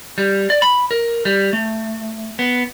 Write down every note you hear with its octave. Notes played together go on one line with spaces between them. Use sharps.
G3
D5
B5
A#4
G3
A3
B3